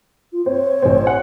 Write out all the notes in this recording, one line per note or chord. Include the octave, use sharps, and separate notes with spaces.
F4
C4 C#5
A1 C4
F#5